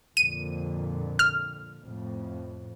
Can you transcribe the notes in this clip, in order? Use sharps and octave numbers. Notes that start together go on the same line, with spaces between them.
F2 A#2 D3 D#7
F6
F2 A2